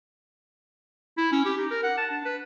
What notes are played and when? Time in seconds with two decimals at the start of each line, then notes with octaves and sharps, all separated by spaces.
1.17 E4
1.32 C#4
1.45 G4
1.58 D#4
1.71 A#4
1.83 F#5
1.98 A5
2.11 D4
2.25 B4